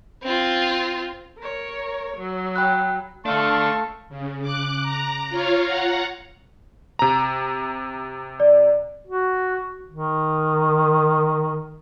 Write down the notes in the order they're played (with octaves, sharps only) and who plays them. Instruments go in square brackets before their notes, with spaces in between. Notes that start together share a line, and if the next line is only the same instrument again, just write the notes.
[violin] C4 F4
[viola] A#4 C#5
F#3
[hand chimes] G5 B5 F#6
[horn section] A3 [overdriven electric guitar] D4 A4 [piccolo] F5 [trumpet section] A5 C6 C#6
[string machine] C#3
D6 F#6
A#5
F4 C#5 F5
F#5 A#5
[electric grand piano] C3 A#5
[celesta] D5
[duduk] F#4
D#3